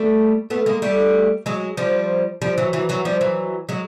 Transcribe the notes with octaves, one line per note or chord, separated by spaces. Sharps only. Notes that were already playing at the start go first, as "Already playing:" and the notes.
Already playing: G3 A3
A3 B3
G#3 A#3
G3 A3
F#3 G#3
F3 G3
F3 G3
E3 F#3
E3 F#3
E3 F#3
F3 G3
E3 F#3
F#3 G#3